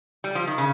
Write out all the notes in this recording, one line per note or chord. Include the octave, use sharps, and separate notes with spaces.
G3
F3
D#3
C#3